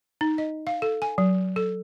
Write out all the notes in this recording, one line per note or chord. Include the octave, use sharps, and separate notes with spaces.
D#4
D#5
F5
A4
G#5
F#3
A4